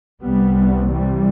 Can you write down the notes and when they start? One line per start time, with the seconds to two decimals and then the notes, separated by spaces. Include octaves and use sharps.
0.21 C2 C3 G3 B3
0.89 E3 G3